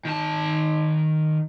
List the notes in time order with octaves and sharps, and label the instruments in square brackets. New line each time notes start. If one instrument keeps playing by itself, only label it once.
[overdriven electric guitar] D#3 A5